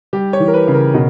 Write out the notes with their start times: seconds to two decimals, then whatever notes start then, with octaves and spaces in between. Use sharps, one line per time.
0.13 G3 G4
0.33 C#5
0.40 E3
0.48 A#4
0.54 B4
0.68 C#3
0.74 A#4
0.94 B2